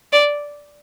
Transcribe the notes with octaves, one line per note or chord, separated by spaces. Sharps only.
D5